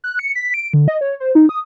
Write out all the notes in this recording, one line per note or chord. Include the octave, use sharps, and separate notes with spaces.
F#6
C#7
B6
D7
D3
D#5
C#5
C5
D#4
D#6